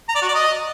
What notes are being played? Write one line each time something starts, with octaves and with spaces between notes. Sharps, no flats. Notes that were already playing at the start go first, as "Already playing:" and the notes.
A#5
D5
F#4
D5
D#5